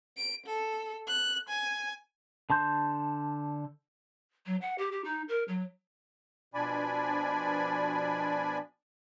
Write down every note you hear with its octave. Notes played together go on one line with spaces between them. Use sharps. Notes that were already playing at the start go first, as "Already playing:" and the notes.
D7
A4
F#6
G#5
D3 A5 C6 G6
F#3
F#5
G4
G4
D#4
A#4
F#3
B2 F3 D4 D5 G#5 B5